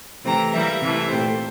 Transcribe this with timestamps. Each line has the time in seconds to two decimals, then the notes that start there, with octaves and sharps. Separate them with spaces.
0.25 C3 E3 A3 C4 A#5
0.53 E3 G3 A#3 E5
0.82 C3 E3 A3
1.11 A#2 A3 C4 C5